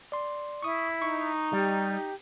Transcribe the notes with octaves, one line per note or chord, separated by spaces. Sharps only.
D5 C6
E4 C#6 D#6
D#4 C#6
G3 G4